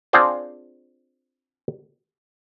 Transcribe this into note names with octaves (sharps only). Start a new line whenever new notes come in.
C4 D4 F4 G#4 C5 D5